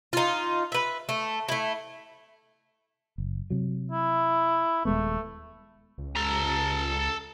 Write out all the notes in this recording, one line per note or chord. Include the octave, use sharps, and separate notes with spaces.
D#4 F4
B4 E5
A3
A3 E4
F#1
C3 F#3
E4
D#1 G#3 A3 B3
C#2
A4 A#5